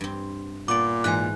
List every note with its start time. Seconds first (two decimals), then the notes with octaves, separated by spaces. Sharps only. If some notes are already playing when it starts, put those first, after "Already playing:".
0.01 G2 C4
0.68 A#2 B3 D5 D6
1.04 G#2 E3 G#3 G#5 F#6